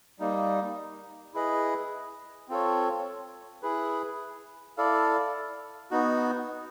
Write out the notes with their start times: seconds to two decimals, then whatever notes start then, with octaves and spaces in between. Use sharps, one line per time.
0.19 G3 A#3 D#4
1.34 E4 G#4 B4 D#5
2.49 C4 F4 A4 C#5
3.63 E4 G#4 B4
4.78 E4 A4 D5 F5
5.91 B3 D#4 F#4